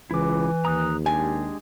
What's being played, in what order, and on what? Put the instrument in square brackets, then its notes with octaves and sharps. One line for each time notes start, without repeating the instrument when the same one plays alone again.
[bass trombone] C#2 [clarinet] E3 [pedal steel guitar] E4 D6
[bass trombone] D#2 [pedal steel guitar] A#5 D#6 F#6
[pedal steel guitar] G#3 D4 G4 [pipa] G#5